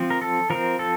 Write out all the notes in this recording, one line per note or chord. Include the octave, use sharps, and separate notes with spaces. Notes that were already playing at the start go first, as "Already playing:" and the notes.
Already playing: F3 C4
A#4
A4
F3 C4 A#4
A4